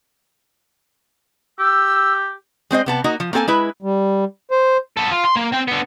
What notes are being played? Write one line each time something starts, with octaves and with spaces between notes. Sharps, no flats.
G4 E6
G#3 C4 C5 D#5
C3 B3 A5
A#3 D#4 F#4 D#5
F3
A#3 C4 A4 G#5 A5
G#3 E4 B4
G3
C5
B3 A4
F4
C6
A#3
C4 G5
D3 B3